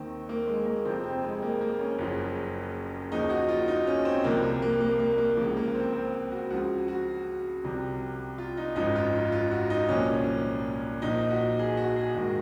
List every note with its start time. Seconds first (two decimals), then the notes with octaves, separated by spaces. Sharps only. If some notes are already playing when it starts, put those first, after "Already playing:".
Already playing: D#2 D#3 C4
0.29 A#3
0.47 G#3
0.66 A#3
0.85 F1 F2 C3 F3 C4
1.03 C4
1.23 G#3
1.42 A#3
1.61 A#3
1.80 C#4
1.98 F#1 F#2 C#3 F3
3.12 D#2 C#3 F3 D#4
3.30 F#4
3.49 F4
3.68 D#4
3.87 C#4
4.05 C4
4.24 C2 C3 F3 A#3
4.43 A#3
4.62 A#3
4.80 A#3
4.99 A#3
5.18 A#3
5.37 C#2 C#3 F3 A#3
5.57 A#3
5.75 C4
5.93 C4
6.32 F#4
6.50 C#2 C#3 F3 F#4
6.88 F#4
7.64 C2 C3 F3
8.38 F4
8.57 D#4
8.76 G#1 F#2 F3 D#4
8.96 F4
9.32 F4
9.52 F#4
9.70 D#4
9.89 C2 A#2 F3 C#4
11.02 A#1 A#2 F3 D#4
11.30 F#4
11.59 G#4
11.77 F#4
11.96 G#4
12.15 A#1 G#2 D#3 F#4